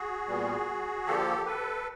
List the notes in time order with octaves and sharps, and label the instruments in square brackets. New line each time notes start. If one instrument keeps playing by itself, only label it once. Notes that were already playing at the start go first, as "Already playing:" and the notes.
Already playing: [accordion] F#4 G#4
A#2 G3 B3
D3 F3 A#3 G4 A4
A4 B4